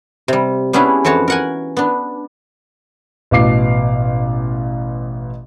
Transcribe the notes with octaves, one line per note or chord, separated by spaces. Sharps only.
C3 G3
G3 B3 C#4 D4 E4 G#4
F2 E3 F#4 C#5 A5
A#4 F#5 G#5
B3 D4
A1 B2 F5 D6 C7